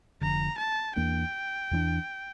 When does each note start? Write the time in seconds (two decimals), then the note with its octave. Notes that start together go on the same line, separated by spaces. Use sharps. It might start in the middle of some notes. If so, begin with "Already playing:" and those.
0.21 F1 F2 D3 A#5
0.59 A5
0.96 E2 E3 A#3 D4 G5
1.71 E2 E3 A#3 D4